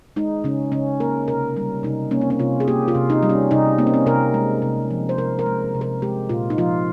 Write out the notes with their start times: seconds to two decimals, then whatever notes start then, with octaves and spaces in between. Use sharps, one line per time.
0.16 G#3 D#4
0.44 C#3 C#4
0.72 C#3 C#4
1.00 A#3 A#4
1.28 C3 A#4
1.57 G3
1.83 C3 D#4
2.11 A#3 C#4
2.21 C4
2.30 C#4
2.39 C3 F4
2.60 G#4
2.68 A#3 G4
2.88 F4
2.95 C3
3.10 D#4
3.23 G3
3.30 C#4
3.51 C3 D#4
3.78 A#3 C4
3.87 C#4
3.94 C4
4.06 C3 A#4
4.34 G#3
4.62 C3
4.91 F3
5.09 C5
5.18 C3 A#4
5.39 A#4
5.46 G#3
5.75 C3
5.81 A#4
6.02 G#3 G4
6.29 A#2 F4
6.50 D#4
6.58 F3 F4